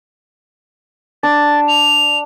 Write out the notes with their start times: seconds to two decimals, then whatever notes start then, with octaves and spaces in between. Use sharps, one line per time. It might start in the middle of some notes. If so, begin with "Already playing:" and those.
1.23 D4 A6
1.68 F7